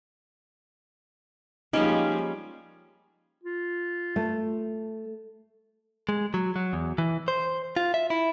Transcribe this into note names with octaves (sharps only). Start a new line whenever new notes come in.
F3 G3 G#3 A#3 C#4 D#4
F4
A3
G#3
F#3
F#3
E2
E3
C5
F4
E5
E4